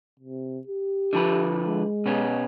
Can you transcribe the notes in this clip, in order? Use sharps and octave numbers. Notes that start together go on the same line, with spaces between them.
C3
G4
D3 F3 B4
G#3
B2 B3 C#4